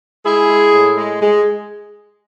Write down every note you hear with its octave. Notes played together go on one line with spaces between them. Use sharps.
G#3 E4 G#4
G#3
A2
G#3
G#3